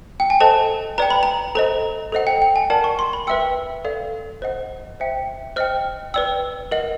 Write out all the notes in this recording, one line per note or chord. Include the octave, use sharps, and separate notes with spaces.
G5
G#5
A4 C5 D#5 A5
B4 D5 G5 A#5
B5
A#5
A4 C5 D#5 A#5
A4 C5 D#5 F#5
G5
G5
G#5
A#4 D5 F#5 A5
C#6
C6
B5
B4 E5 G5 E6
A4 D5 F5
C5 D#5 F#5
C5 E5 G5
C5 D#5 G5 F6
B4 D5 G5 E6
A#4 D#5 F#5